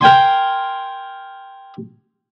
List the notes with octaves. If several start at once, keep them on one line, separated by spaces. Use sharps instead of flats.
A#4 G5 G#5 C6